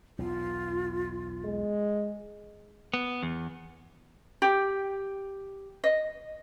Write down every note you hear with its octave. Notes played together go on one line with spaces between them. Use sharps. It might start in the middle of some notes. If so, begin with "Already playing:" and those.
B1 E2 F4
G#3
B3
E2
G4
D#5